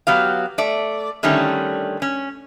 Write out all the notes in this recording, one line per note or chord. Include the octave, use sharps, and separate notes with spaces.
F#3 B3 G4 F5
A3 D5
D3 D#3 G3 A3 C#4
C#4